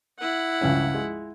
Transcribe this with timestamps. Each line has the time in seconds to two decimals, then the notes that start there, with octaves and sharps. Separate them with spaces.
0.19 E4 F#5
0.61 C#2 G2 C#4
0.94 G#3